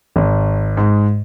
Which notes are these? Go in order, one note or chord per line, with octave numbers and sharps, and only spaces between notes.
G#1
G#2